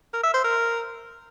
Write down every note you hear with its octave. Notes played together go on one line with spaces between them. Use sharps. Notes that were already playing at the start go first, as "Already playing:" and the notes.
A#4
E5
C5
A#4